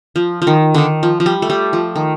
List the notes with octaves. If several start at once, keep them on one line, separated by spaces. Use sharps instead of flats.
F3
F3
D#3
D3 D#3
F3
F3
G3
A3
G3
F3
D#3